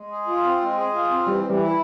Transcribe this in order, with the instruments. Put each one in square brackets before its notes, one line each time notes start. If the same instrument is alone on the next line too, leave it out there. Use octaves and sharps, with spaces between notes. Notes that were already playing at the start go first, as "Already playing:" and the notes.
Already playing: [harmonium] G#3
G#4
F4
C4
G#3
G#4
F4
C4
[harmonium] E3 [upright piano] G3
[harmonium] E3
[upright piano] G3
[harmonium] E4